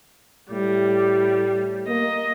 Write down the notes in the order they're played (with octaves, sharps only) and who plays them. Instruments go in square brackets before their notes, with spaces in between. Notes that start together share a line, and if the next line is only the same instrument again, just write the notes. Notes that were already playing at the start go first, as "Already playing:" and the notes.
[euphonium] A2 [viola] G3
[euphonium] A#3 [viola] D#5